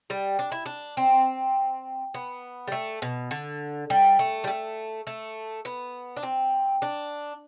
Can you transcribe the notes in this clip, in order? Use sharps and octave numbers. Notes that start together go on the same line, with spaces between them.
G3
D4
E4
D4
C4
B3
G3
A3
B2
D3
G3
A3
G3
A3
A3
B3
D4
C4
D4